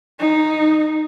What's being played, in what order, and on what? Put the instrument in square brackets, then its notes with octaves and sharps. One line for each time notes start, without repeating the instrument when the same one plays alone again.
[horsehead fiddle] D#4